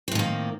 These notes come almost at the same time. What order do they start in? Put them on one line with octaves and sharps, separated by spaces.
C4 A2 D#3 A#3